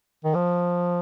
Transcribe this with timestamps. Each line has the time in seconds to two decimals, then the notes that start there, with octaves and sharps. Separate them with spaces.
0.25 D#3
0.35 F3